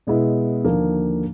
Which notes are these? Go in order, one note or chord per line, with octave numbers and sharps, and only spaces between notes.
B2 G#3 B3 E4
D#2 D3 F3 A#3